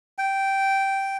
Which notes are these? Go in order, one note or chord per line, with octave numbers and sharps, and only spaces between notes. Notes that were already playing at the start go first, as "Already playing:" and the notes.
G5